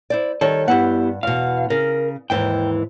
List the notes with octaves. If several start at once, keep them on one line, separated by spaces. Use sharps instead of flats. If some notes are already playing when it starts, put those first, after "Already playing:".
E4 C5 D5
D#3 G3 A4 C#5
G2 B3 E4 G4 F#5
E2 B2 F5
C#3 A#4
D#2 G#2 E3 G5